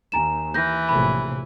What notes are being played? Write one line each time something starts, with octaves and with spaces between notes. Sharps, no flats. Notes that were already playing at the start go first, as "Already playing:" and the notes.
D#2 G#5 A#5 E7
E3 G6 A#6
A#1 A2 C3 B5